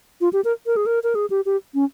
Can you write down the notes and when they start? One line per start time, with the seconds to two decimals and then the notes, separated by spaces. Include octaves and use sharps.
0.21 F4
0.33 G4
0.44 A#4
0.66 A#4
0.76 G#4
0.86 A#4
1.03 A#4
1.15 G#4
1.30 G4
1.46 G4
1.74 C#4